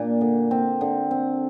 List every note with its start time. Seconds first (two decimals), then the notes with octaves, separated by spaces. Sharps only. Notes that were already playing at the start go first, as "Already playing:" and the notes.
Already playing: A#2 D4
0.21 D3
0.51 C4
0.81 D3
1.11 C4